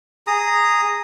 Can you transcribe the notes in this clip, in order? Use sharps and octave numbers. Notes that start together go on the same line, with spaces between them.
G#4 A#5 D#6